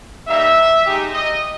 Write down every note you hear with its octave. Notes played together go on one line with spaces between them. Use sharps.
G3 A#3 D#4 E5
G#3 D#4 G4
D#5